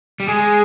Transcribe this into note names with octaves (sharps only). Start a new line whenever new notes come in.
G3
G#3 G#4